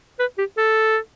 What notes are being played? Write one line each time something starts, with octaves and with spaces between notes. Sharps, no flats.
B4
G4
A4